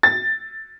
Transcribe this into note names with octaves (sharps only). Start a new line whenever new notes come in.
A6